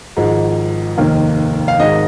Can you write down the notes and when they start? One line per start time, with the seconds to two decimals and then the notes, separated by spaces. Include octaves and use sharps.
0.17 G#1 G#2 F3 G#3
0.98 F1 D#2 D#3 A#3
1.68 F5
1.79 G#1 G#2 G#3 D#5